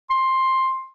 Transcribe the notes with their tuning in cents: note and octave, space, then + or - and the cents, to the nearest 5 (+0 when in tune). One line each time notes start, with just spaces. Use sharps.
C6 +10